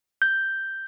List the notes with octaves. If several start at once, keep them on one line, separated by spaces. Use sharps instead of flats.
G6